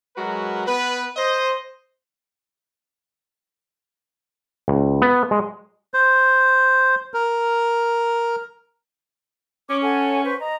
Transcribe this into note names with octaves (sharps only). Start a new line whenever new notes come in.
F#3 G#3 F#4 A#4 B4
B3 B4
C5 D#5
C#2
B3
G#3
C5
A#4
C#4 D6
A4 F#5 G#5
B4 C5 C#6
D#5 A#5